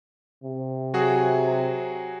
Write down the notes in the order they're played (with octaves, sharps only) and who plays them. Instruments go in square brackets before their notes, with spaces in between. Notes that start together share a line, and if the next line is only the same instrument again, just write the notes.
[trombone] C3
[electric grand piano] F#3 F#4 G#4